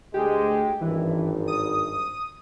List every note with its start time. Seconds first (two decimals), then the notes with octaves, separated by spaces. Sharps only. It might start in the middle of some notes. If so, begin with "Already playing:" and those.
0.14 D2 G#3 G4
0.81 G#1 G2 E3
1.48 D#6